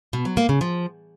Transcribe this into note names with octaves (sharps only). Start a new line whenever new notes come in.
B2
F#3
A#3
C#3
F3